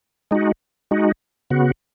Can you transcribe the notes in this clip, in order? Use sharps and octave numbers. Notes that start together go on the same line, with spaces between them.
G#3 D#4 F#4
G#3 D#4 F#4
C#3 B3 F#4